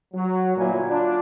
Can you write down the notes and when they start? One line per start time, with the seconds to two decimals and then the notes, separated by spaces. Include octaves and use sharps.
0.14 F#3
0.57 G1 A#2 F#3 A#3 E4 G#5
0.90 D4 F4